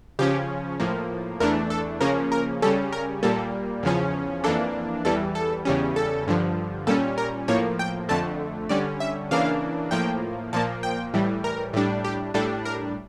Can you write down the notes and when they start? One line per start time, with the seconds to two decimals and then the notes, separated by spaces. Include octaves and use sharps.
0.19 C#3 F3 C#4 G4
0.80 A2 F3 A#3
1.40 E2 E3 A3 D4 A#4
1.70 A4
2.01 C#3 F3 A#3 C#4 A#4
2.32 A#4
2.62 C#3 G3 C#4 A4
2.92 A#4
3.23 A#2 G3 A#3 A4
3.83 E2 C#3 F3 C#4
4.44 F2 E3 A#3 D4 A4
5.05 E2 E3 G3 A4
5.35 A4
5.65 E2 C#3 G3 C#4
5.96 A4
6.27 G2 D3 F3
6.87 A#2 G3 C#4 A4
7.18 A#4
7.48 A2 F3 A#3 C#5
7.79 G5
8.09 F2 D3 A3 A5
8.69 D3 G3 C#4 D5
9.00 E5
9.31 C#3 E3 A#3 D4 F5
9.91 A2 F3 A#3 G5
10.53 A#2 F3 A#3 A5
10.83 G5
11.14 A2 E3 G3
11.44 A#4
11.73 A2 G3 D4
12.05 G4
12.34 A2 G3 D4 A4
12.65 A#4